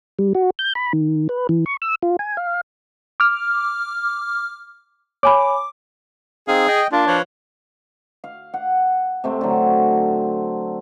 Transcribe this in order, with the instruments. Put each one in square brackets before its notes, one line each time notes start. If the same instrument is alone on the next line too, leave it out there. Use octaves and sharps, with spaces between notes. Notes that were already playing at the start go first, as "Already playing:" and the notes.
[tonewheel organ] G3
F#4
G6
B5
D#3
B4
E3
C#6
E6
F4
G#5
F5
[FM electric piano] D6 F6
[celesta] C#5 G#5 B5 [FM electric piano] D6
[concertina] C4 D#4 F5 [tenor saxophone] G#4
[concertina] D#5 G5
[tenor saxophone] A#3 [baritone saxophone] D4 [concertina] F4
[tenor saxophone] F3 [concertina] B4 C#5
[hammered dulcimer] F5
F#5
C3 A3 C4
D3 F#3